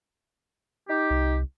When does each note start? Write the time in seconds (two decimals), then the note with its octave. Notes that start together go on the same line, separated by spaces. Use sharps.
0.89 D#4 G4
1.10 C2